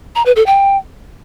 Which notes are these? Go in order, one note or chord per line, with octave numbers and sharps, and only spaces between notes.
A#5
B4
A4
G5